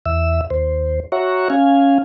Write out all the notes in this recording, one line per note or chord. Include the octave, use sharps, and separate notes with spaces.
E2 E5 E6
D#2 C5
F#4 C#5 E5 F#5 A#5 C#6
C#4 F5 G#5